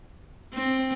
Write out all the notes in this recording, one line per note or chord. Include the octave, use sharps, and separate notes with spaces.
C4